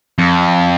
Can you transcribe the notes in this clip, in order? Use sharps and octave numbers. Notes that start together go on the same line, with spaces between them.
F2